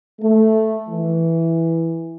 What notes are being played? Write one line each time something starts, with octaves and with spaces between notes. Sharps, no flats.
A3
E3